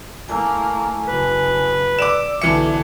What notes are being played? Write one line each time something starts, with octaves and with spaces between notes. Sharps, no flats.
A3 A#3 E4 G#5
F#1 B4
D5 D6 E6 E7
B1 D3 E3 E5 D6 C#7